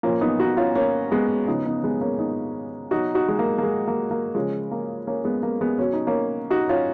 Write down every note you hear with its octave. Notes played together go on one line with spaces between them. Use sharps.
A#2 F3 A#3 C#4
B3 D#4
D#4 F#4
C#4 F4
A#3 C#4
G#3 B3
C#3 F3 B3 D#4
B3 D#4
G#3 B3
A#3 C#4
B3 D#4
B2 F#3 D#4 F#4
D#4 F#4
G#3
A#3
A#3
G#3
A#3
A#3
C#3 F3 G#3
A#3
A#3 C#4
G#3 B3
A#3
G#3 B3
B2 F#3 C#4
D#4
A#3 C#4
D#4 F#4
C#4 F4